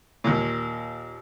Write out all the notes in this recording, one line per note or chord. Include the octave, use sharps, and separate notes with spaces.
D#2 A#2